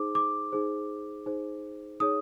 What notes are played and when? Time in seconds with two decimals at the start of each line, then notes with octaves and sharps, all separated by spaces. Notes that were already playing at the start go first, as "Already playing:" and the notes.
Already playing: D#4 G#4 C5 D6
0.15 D6
0.52 D#4 G#4 C5
1.26 D#4 G#4 C5
2.00 D#4 G#4 C#5 D#6